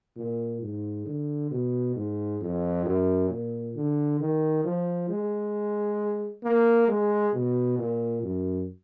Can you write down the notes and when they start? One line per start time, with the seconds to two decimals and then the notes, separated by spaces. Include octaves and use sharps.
0.17 A#2
0.61 G#2
1.06 D3
1.51 B2
1.96 G#2
2.41 F2
2.85 F#2
3.30 A#2
3.75 D3
4.20 D#3
4.64 F3
5.09 G#3
6.43 A#3
6.88 G#3
7.33 B2
7.78 A#2
8.23 F#2